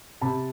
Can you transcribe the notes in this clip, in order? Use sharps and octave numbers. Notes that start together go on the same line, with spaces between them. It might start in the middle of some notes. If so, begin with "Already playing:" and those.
C3 A5 B5